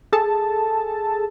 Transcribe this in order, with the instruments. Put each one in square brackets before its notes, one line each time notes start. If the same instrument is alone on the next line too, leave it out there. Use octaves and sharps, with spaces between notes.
[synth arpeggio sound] G#4 A4 A5